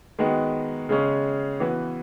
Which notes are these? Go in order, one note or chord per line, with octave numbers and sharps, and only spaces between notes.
D#3 G#3 B3 F#4
C#3 G#3 C#4
E3 B3 F#4